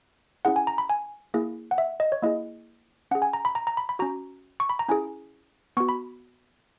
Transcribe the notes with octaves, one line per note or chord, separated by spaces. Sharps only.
C#4 E4 G#4 F#5
G#5
A#5
B5
G#5
A#3 E4 G#4
F#5
E5
D#5
C#5
A#3 E4 G#4 D#5
C#4 G#4 F#5
G#5
A#5
B5
A#5
A#5
B5
B5
C#4 F#4 A#5
C#6
B5
A#5
C#4 E4 G#4 G#5
B3 F#4 C#6
B5